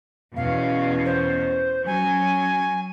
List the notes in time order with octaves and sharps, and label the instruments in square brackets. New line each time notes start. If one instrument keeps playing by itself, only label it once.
[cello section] E2 B2 C#4 [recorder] F5
[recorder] C5
[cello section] F#3 C#4 [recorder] G#5